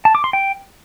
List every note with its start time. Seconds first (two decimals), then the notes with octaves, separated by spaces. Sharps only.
0.05 A5
0.15 D6
0.24 C6
0.33 G5